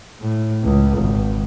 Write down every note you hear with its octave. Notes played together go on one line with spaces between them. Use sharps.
A2
C#2
G#1